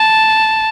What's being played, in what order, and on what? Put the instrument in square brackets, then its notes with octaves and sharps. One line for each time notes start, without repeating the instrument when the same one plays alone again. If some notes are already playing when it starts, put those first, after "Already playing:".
Already playing: [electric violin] A5